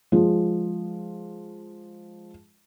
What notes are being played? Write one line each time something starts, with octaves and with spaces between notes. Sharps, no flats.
F3 G#3